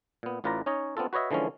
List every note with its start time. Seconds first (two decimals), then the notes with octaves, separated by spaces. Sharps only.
0.23 A#2 B3
0.44 A1 A2 F4 B4 D5 A#5
0.66 C#4 D#4 C#5 D#5
0.97 B3 C4 D4 F4 A4
1.13 F#4 B4 C#5 D#5 E5
1.31 D3 E3 F3 G#3 C#4